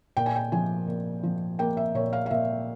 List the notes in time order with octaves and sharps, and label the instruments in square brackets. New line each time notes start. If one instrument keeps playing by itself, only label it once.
[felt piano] A#2 G5
G#5
G5
F3 G#5
A#2
F3
A#3 G5
E5
A#2 C#5
F5
F5
A#2 E5